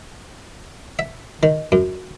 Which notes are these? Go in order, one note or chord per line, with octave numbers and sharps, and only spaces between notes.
E5
D#3
F#2